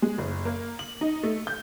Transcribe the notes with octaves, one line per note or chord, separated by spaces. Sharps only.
G#3
F#1
A#3
F#7
D#4
A3
G6